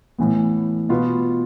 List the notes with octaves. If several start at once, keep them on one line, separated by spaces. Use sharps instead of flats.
A2 E3 B3
B2 B3 F4 B4